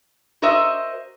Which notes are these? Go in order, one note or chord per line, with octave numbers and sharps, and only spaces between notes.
F#4 A#4 C5 D#5 E5